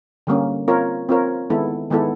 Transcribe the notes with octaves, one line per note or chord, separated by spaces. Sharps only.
D3 G3 A#3 C#4
C4 F4 A#4 C#5
C4 F4 A#4 C#5
D#3 G#3 B3 E4 A4
D#3 G#3 B3 E4 A4